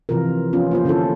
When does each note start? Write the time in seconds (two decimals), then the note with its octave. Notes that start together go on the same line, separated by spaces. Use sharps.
0.09 C3 E3 F3 F4 A#4
0.53 F3 B3 C#4 F4
0.71 A#3 F4 C5
0.85 D3 C#4 E4 F4 A4